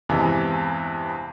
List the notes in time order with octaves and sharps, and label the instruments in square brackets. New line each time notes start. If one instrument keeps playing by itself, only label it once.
[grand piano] E2 G2 C3 E3 G#3